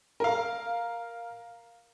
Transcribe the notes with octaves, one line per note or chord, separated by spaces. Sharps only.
A#4 F5